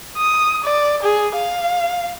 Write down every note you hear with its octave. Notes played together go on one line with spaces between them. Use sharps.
D#6
D5
G#4
F5